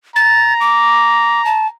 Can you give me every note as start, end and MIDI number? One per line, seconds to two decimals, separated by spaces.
0.16 1.75 82
0.16 0.54 93
0.60 1.44 86
1.45 1.67 81